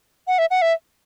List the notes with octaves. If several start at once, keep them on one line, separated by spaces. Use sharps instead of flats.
F#5
E5
F#5
E5